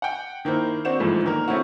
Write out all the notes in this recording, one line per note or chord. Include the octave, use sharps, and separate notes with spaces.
F#5 G5
D#3 A#3 E4 C5
C4 D4 F#4 C5 E7
G#2 E3 F3 A3
D3 D#3 A#3 A#4
A3 C4 C#4 E4 F#4